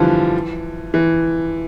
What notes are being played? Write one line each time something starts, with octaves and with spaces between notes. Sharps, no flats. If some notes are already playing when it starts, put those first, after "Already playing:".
Already playing: D3 E3 F3 G3
E3